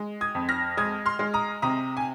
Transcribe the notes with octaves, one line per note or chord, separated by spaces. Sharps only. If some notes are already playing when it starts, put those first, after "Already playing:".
Already playing: G#3
D#6 G#6
F2
F6 A#6
G#3 D#6 G#6
C6 F6
G#3
A#5 D#6
C3 A#5 D#6
G#5